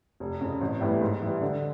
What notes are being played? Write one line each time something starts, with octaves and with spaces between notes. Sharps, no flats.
F1
F2 C#3
A1
A2 E3 G3 B3
G#2
E3 G3
D3